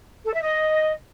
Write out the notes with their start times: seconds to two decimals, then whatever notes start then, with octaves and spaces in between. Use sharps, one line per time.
0.25 A4
0.33 E5
0.42 D#5